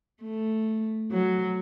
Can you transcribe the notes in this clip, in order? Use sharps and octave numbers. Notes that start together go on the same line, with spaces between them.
A3
F#3